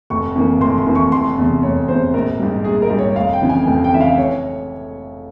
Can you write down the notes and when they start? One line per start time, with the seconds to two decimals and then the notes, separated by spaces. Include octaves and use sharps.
0.10 F1 C#6
0.35 F2 E3 A#3
0.61 F1 C6
0.78 C6
0.87 F2 E3 A#3
0.95 C#6
1.12 F1 C6
1.38 E2 C3
1.63 F1 C#5
1.88 E2 C3 C5
2.14 A#1 A#4
2.39 G#2 G3
2.64 A#1 G#4
2.82 A#4
2.90 G#2 G3
2.99 C#5
3.15 F1 F5
3.33 G5
3.42 F2 C#3 E3
3.49 G#5
3.67 F1 G5
3.84 G5
3.92 F2 C#3 E3 E5
4.01 F5
4.18 C#5